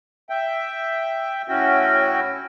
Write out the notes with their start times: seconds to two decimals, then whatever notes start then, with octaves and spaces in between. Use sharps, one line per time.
0.30 E5 G5
1.49 A2 C#4 E4 F#4 G5